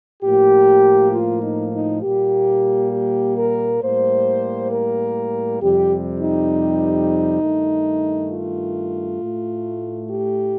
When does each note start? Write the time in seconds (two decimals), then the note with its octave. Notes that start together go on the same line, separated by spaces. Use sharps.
0.23 A2 F3 A#3 G4
1.13 F4
1.42 D#4
1.72 D#4
2.03 A#2 G3 A#3 G4
2.92 G4
3.37 A#4
3.82 A2 G3 A#3 C5
4.71 A#4
5.61 F2 C3 G3 G4
6.21 D#4
7.41 G2 D#3 A3
8.31 F4
9.21 A2 A3
10.10 G4